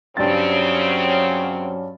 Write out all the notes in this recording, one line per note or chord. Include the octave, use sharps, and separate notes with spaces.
G2 C#3 F#3 C4 C#4 A6